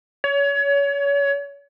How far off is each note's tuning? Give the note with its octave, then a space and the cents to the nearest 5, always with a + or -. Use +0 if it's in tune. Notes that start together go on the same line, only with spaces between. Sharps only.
C#5 +30